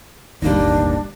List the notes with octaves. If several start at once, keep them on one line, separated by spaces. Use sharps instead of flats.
E1 A1 D#2 G3 A#3 D4 D#4